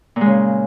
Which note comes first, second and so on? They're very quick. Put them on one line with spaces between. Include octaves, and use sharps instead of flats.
A#2 G#3 C#3